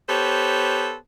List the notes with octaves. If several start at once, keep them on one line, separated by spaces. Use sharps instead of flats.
B3 G4 A4 C5 C#5